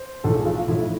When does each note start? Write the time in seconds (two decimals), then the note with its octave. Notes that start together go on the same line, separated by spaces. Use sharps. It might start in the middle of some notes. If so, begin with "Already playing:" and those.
Already playing: C5
0.24 B1 A2 F3 A4
0.35 G#4
0.45 F4
0.57 F4
0.68 B1 A2 F3 E4